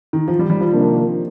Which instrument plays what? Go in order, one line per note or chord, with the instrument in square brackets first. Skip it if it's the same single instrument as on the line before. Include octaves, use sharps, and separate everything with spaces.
[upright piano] D#3
F3
G3
G3
F3
[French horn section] C3 D#3 A#3 D4